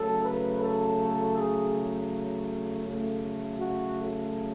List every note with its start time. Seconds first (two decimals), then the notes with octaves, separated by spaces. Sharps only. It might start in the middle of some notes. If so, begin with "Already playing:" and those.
Already playing: C#3 F#3 A3 A4
0.23 B4
0.61 A4
1.35 G#4
2.84 C#3 F#3 A3
3.60 F#4
3.97 A4